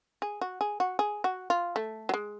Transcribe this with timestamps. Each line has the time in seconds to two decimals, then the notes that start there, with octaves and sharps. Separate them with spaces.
0.22 G#4
0.41 F#4
0.61 G#4
0.80 F#4
0.99 G#4
1.24 F#4
1.50 F4
1.76 A3
2.09 F#3
2.14 G#3